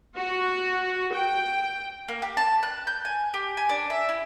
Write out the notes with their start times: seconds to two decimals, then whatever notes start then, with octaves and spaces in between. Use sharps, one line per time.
0.17 F#4
1.13 G5
2.08 A#3
2.22 G4
2.37 A5
2.63 F#6
2.87 G6
3.05 G#5
3.34 G4
3.57 G#5
3.69 D4
3.90 E5
4.09 E4